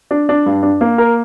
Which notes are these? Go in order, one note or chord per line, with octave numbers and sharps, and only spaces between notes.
D4
D4
G2
D4
A#3
A#4